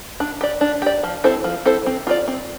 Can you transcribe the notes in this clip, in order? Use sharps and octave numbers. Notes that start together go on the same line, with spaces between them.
D4
G4 D5
D4
G4 D5
F3
C4 E4 A4 C5
F3
C4 E4 A4 C5
C4
F4 B4 D5
C4